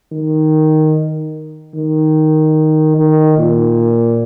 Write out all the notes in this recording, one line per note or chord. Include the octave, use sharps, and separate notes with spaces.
D#3
D#3
D#3
A#2